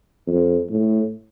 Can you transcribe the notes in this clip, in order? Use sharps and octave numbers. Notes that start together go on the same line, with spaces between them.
F2
A2